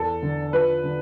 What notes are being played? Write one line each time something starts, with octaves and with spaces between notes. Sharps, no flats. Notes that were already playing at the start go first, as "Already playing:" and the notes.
Already playing: E2 A4
D3
F3 B4
D3